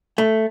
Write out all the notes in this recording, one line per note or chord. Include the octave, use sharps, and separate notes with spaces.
A3